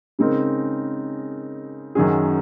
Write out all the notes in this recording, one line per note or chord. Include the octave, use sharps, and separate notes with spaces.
C#3 G#3 C4 D#4 A#4
F#2 D#3 F#3 C#4 G#4